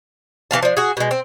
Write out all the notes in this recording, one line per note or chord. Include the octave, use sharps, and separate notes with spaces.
E3 A3 F5 A5
F3 D4
F#4 G#4
B2 G#3
C4